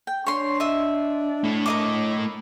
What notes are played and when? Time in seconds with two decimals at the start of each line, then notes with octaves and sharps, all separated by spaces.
0.07 G5
0.26 D4 C#5 C6
0.60 D#5 E5
1.44 A3 E4
1.66 A#4 D#5 D6